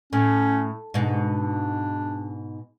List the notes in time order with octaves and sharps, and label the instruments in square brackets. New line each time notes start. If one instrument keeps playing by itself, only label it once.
[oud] A2 [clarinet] C#4
[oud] G#2 B2 [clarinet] D4